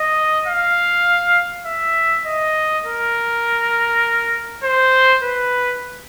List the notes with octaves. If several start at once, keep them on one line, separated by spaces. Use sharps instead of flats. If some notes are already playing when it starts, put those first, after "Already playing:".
Already playing: D#5
F5
E5
D#5
A#4
C5
B4